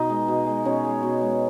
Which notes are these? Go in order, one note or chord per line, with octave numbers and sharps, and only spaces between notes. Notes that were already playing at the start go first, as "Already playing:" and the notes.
Already playing: B2 D#4 D#5
G#3
B2
G#3
B2 C#4 C#5
G#3
B2
G#3